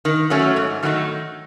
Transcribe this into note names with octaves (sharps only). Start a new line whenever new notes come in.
D#3
F#3 A3 C#4 F#4
G#2
D#3 F#3 A3 D#4